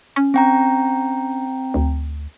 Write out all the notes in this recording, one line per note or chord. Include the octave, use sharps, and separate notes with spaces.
C#4
C4 G5 A#5
D2